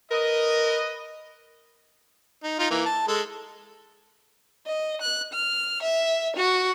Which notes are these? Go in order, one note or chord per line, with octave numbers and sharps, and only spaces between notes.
A#4 B4 D#5
D#4
D#4 F4
E3 A#3
A5
G#3 A4
D#5
F#6
F6
E5
F#4